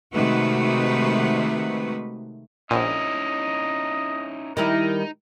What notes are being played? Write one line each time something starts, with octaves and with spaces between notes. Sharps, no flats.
C3 D#3 G#3 A3 F#4 B4
A#1 C#4 D#4 E4 D#5
D#3 G3 D#4 E4 A#4